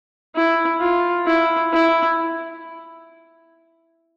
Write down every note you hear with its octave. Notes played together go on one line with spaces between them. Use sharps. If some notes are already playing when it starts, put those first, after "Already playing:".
E4
F4
E4
E4